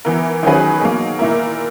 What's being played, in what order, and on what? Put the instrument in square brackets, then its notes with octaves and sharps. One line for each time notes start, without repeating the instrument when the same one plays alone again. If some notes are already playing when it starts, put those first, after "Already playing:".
[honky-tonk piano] E3 B3 E4 A#4
D#3 F#3 C#4 G#4 B4
B2 F#3 A#3
A#2 A#3 E4 A#4